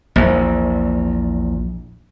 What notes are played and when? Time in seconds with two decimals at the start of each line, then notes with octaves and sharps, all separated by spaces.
0.16 A#1 E2